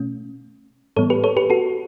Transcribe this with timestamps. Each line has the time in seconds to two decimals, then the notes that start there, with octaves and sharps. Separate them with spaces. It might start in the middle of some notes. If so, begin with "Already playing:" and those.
Already playing: B2 A3 C#4
0.96 A2 E3 G3 B3 A4 C#5
1.10 G4 B4
1.24 A4 C#5
1.37 G4 B4
1.50 F#4 A4